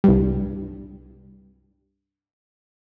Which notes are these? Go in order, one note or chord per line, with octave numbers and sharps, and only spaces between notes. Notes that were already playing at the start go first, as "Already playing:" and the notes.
C2 G2